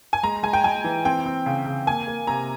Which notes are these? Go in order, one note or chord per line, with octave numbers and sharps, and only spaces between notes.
G#5
G#3 A#5
G#3 G#5
G5
G#3 G#5
E3
C4 G5
C4
C#3
C#3
A#3 G#5
A#3
C3 A#5